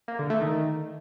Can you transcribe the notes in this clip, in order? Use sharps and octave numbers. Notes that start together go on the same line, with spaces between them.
A#3
D3
A3
D#3